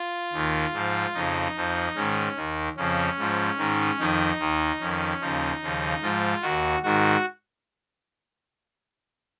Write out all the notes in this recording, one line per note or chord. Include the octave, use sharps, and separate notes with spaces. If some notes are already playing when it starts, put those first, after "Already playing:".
Already playing: F4
D#2 D#3
G#2 F3
F2 C#3 F3 D#4
F2 F3
G#2 D#3 C#4
D#2 D#3
F2 C#3 F3 C#4
G#2 F3
G#2 D#3
F2 D#3 D#4
D#2 D#3
F2 D#3 C#4
D#2 C#3 F3 D#4
D#2 C#3 F3
G#2 F3 F4
D#2 D#3 F#4
G#2 D#3 F#4